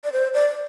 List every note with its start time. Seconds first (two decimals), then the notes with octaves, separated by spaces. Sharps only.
0.04 D5
0.12 C5
0.34 D5